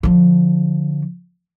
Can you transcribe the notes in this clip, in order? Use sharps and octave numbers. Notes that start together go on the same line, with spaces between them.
D3 F3